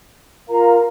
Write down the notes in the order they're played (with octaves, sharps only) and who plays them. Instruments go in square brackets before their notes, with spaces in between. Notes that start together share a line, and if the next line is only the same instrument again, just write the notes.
[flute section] F4 A#4 F5 A#5